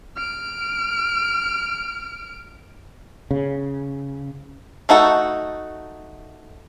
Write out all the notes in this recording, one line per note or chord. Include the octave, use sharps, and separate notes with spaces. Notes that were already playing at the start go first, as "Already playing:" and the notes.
F6 D7
C#3
A3 D#4 F#4 A4